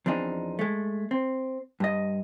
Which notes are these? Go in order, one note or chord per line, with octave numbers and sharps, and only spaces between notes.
E2 F3 C4 D4 D#4
G#3 A3
C4
G2 D#5